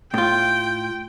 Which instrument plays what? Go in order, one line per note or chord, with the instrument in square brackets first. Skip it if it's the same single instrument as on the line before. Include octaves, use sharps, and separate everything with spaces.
[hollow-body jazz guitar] A2 F4 [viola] G5